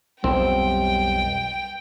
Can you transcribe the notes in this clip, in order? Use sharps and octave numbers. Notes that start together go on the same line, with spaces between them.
B1 F2 G3 C4 G5